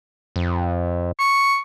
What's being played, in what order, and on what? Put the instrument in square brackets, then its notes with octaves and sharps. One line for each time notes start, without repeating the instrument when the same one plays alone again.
[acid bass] F2
[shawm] C#6